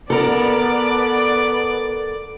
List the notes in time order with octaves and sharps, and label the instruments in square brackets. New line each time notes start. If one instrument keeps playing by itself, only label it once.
[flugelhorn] B3 [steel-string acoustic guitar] A4 A#4 [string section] D5